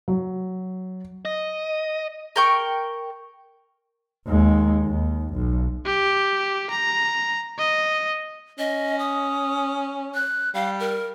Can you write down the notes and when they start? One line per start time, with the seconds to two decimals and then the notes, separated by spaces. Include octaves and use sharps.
0.08 F#3
1.25 D#5
2.36 A#4 G5 C#6
4.27 D#2 G#3
4.84 D#2
5.34 B1
5.86 G4
6.71 A#5
7.59 D#5
8.59 C#4 D#5
8.99 D#6
10.14 F#6
10.54 G3 F5
10.80 A#4